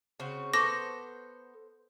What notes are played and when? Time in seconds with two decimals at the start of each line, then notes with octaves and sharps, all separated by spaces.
0.20 C#3 C4 F#4
0.54 B3 A4 C5 C#6 D6 A#6